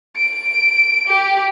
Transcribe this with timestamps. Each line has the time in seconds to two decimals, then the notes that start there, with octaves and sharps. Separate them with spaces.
0.17 D7
1.08 G4